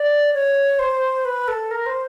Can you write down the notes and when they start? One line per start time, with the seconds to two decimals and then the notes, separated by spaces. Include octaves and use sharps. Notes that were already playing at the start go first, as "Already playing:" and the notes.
Already playing: D5
0.34 C#5
0.79 C5
1.25 B4
1.48 A4
1.71 A#4
1.86 C5